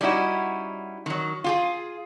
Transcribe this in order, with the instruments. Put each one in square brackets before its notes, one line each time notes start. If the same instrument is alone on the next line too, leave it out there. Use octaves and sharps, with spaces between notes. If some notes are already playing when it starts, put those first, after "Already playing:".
[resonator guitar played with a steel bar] G3 C#4 D#4 E4 F#4
D#3 F#3
F4 G4 G#4